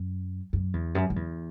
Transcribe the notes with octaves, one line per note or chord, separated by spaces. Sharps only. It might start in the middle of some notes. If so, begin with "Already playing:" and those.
Already playing: F#2
F#2
E2
F#2
F#2
E2